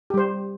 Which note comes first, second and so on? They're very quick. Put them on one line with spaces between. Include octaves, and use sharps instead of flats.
G4 G3 C5